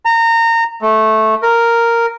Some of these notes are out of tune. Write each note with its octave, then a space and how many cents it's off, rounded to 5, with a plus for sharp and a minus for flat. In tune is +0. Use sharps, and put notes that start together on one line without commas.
A#5 -25
A3 -10
A#4 -5